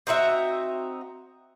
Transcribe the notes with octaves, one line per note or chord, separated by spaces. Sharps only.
C4 D#4 F#4 E5